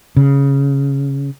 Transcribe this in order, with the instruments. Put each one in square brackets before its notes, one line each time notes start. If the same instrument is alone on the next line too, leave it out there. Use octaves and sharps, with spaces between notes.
[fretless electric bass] C#3